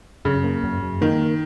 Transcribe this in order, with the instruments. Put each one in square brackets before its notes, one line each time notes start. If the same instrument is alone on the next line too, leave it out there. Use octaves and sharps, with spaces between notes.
[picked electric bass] F#2 [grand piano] C#3
[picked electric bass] A#3
F#2
F#2
[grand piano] D#3 [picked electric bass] A#3